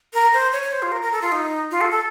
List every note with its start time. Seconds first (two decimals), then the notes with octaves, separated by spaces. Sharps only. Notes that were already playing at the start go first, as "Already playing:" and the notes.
0.14 A#4
0.34 C5
0.52 C#5
0.63 C#5
0.72 C5
0.82 F4
0.92 A#4
1.02 A#4
1.12 A4
1.22 F4
1.32 D#4
1.71 F4
1.81 A4
1.91 A4